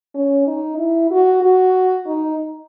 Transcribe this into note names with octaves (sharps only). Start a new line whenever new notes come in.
C#4
D#4
E4
F#4
F#4
D#4